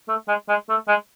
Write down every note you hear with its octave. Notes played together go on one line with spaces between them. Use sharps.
A3
G#3
G#3
A3
G#3